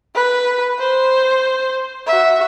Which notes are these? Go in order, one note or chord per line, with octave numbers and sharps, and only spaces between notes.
B4
C5
F#4 E5